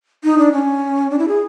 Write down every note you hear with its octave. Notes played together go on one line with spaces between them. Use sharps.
D#4
D4
C#4
D4
E4
G#4